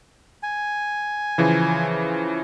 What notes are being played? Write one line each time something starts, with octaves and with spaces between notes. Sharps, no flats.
G#5
C#3 E3 F3